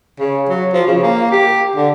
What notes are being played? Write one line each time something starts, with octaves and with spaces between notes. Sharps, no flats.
C#3
F#3
F3
C#3
A#3
G4
D3